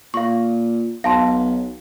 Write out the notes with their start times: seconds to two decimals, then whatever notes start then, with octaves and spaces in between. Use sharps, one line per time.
0.14 A#2 F5 C#6
1.04 B1 F5 A5 C6